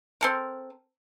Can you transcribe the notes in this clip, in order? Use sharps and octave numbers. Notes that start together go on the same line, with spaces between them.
C4 A4 A#4